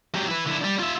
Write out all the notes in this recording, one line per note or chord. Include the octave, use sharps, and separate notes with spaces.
F#3 G4
E4 B4
D3 E4
G3
F4 E5